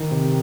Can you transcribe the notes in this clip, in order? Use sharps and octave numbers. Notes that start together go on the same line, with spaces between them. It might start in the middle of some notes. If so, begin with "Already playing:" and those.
Already playing: D#3
C3